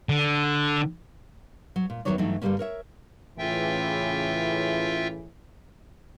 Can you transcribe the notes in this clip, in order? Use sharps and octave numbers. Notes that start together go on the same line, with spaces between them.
D3
F#3
A#2
E2 C3 D#3 F#3 C#5 D5
G2 E3 F#3 A3 D#4
G2 D3 F3 G3 A#3 C#4
A#4 C#5 E5
A2 C#3 E3 F4 E5 G5